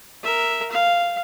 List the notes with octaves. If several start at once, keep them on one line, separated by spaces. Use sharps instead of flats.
A#4 E5
F5